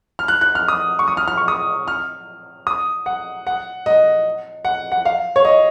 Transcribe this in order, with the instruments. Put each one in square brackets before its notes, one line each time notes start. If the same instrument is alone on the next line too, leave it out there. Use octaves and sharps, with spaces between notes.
[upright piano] F6
F#6
F#6
F6
D#6
C#6
D#6
F6
F6
C#6
D#6
F6
D#6
F#5
F#5
D#5
F#5
F#5
F5
C#5
D#5